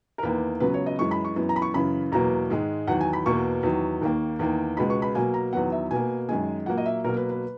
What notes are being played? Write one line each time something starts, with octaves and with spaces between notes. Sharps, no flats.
A#4
E2 D#3 A#3 B4
C#2 C#3 F#3 B3 B4
C#5
D#5
F#2 E3 G#3 C#6
B5
C#6
F#2 E3 B3
A#5
B5
C#6
F#2 C#3 E3 B5
E2 B2 F#3 A#3 A#5
G#2 D#3 G#3
E2 D#3 F#3 F#5
G#5
B5
E2 B2 A#3 C#6
E2 D#3 F#3
D#2 D#3 A#3
E2 D#3 A#3
C#2 B2 G#3 B3 B5
C#6
B5
B2 F#3 A#3 G#5
A#5
E2 D#3 F#3 B3 F#5
E5
B2 A#3 G#5
F#2 D#3 G#3 G#5
A#2 F#3 A#3 F#5
D#5
E5
B2 F#3 A#3 A#4
B4
B4